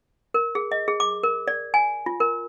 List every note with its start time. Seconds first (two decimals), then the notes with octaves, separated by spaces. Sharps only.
0.34 A#4
0.55 G#4
0.72 D#5
0.88 G#4
1.00 D6
1.23 A#4
1.48 D5
1.74 G#5
2.06 F4
2.20 A#4